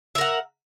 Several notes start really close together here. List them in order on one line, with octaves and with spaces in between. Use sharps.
E5 A#4 F#5